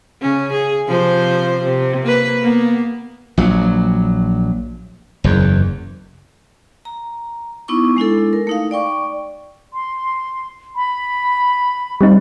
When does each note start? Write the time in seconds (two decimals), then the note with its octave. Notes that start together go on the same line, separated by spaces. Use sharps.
0.22 C#3 C#4
0.53 G#4
0.87 C3 F3 C5
1.63 C3
2.02 A#3 B4
2.43 A#3 B3
3.38 A#1 F#3
5.24 F#1 E2
6.85 A#5
7.68 B3 D#4 E4 C#6 D6
7.97 G#3 D4 E4 A4
8.33 A#4
8.47 A3 D#4 F5
8.71 D5 G5 C#6 D6
9.73 C6
10.76 B5
12.01 G3 C4 D#4